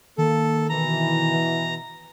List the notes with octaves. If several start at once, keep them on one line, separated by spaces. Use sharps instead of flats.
D#3 A#3 A4
B2 E3 A#5